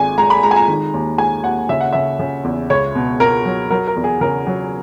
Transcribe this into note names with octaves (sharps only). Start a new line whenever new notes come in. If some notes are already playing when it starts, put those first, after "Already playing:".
Already playing: G#1 G#3 G#5
G#3 A#5
B5
G#3 A#5
G#5
A#5
D#3
D#2
G#3 G#5
D#2 F#5
C#3 E5
F#5
C#3 E5
C#3
E2
C#2 C#5
B2
B2 A#4
F#3
F#3 A#4
A#4
E2
G#4
C#3 A#4
F#3